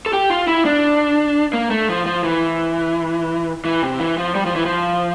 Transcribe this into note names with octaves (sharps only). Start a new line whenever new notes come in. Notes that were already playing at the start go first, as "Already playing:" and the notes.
A4
G4
F4
E4
D4
A#3
A3
F3
F3
E3
E3
C3
E3
F3
G3
F3
E3
F3